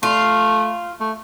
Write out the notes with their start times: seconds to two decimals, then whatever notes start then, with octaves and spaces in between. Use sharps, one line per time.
0.03 A3 F4
1.00 A3